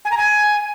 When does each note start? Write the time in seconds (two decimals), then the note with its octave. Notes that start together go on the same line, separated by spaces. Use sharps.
0.05 G#5
0.11 A#5
0.17 G#5